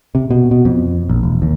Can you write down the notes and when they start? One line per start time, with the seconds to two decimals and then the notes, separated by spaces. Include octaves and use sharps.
0.15 C3
0.31 B2
0.51 B2
0.65 F2
1.10 A#1
1.23 E1
1.42 D#2